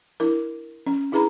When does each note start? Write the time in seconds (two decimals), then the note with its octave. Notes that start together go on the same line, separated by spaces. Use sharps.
0.20 D4 E4 A#4
0.86 C#4
1.12 D4 E4 G#4 B4 A#5 B5